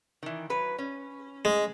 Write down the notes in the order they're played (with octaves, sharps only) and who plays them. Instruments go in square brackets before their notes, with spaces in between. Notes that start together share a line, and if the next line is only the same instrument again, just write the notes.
[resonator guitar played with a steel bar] D#3 E3
F#3 B4
C#4
[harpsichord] G#3